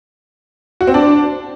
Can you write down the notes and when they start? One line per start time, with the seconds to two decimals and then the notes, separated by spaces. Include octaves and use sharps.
0.81 F#4
0.87 C4
0.94 D4